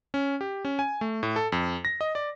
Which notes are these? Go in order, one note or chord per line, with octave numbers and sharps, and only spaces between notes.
C#4
G4
C#4
G#5
A3
A2
A4
F2
A#6
D#5
D5